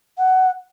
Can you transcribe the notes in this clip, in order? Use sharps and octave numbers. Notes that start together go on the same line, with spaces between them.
F#5